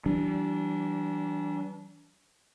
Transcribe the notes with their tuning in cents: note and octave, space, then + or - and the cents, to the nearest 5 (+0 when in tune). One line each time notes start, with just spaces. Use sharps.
E3 +0 G3 -40 D4 -15